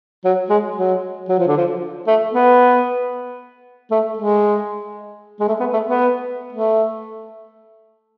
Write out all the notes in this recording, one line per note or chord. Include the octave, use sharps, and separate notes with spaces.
F#3
G#3
F#3
F#3
F3
D3
F3
A3
B3
A3
G#3
G#3
A3
B3
A3
B3
A3